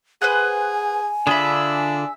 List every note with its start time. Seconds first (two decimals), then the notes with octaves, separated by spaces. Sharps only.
0.22 G#4 B4 C5 F#5 G#5
1.27 D3 D4 F4 G#4 E5 B5